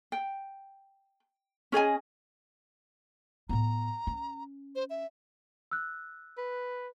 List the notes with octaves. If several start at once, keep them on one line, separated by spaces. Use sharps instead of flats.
G5
C#4 G#4 D#5 G#5
A2 B3 A#5
C#4
C5
E5
E6 F#6
B4